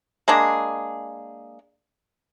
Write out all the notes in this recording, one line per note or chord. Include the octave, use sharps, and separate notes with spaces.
G#3 A#3 D4 G#4